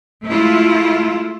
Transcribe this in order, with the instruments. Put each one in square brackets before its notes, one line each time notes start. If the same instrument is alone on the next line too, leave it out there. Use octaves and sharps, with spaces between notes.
[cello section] G#3 A3 E4 F4